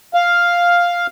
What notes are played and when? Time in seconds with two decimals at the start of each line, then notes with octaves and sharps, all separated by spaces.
0.14 F5